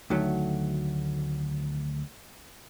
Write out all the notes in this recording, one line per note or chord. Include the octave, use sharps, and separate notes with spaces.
D2 D#3 F#3 A3